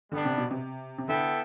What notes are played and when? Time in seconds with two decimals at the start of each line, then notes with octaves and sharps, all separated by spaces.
0.12 D3 G3 B3 D4
0.25 C3
0.38 B2
0.50 C3
0.98 C3
1.08 D3 B3 E4 A4 E5 G5